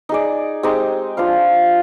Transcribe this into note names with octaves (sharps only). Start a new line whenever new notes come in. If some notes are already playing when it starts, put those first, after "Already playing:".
D#4 G#4 D5
G#3 C4 D#4 G4
D4 F4 C5 F5